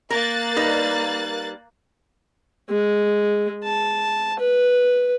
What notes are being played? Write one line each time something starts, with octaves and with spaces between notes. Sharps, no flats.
A#3 A#4 F#6 A6
G3 D#4 B4
G#3
A5
B4